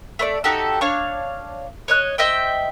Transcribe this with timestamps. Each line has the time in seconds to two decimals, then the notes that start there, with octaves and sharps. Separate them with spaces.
0.19 A3 C5 D5
0.44 D#4 F#4 G4 A4
0.81 D4 C#5 F5 C#6
1.88 C#5 D#5 F#6
2.18 C5 D#5 E5 G5